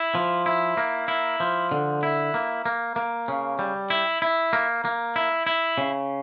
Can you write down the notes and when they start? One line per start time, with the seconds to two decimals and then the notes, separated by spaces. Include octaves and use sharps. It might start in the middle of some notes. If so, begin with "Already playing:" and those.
Already playing: E4
0.15 F3
0.46 E4
0.77 A#3
1.08 E4
1.40 F3
1.71 D3
2.03 E4
2.34 A#3
2.66 A#3
2.96 A#3
3.28 C#3
3.59 G3
3.90 E4
4.22 E4
4.53 A#3
4.85 A#3
5.16 E4
5.47 E4
5.78 C#3